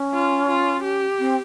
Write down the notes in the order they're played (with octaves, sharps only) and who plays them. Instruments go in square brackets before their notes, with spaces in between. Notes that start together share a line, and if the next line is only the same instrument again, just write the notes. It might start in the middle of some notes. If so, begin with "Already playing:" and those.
Already playing: [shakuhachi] C#4
[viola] F4
F4
G4
[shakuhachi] C4